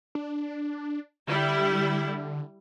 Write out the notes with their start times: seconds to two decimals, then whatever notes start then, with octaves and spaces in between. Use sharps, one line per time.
0.15 D4
1.28 D3 G3 E4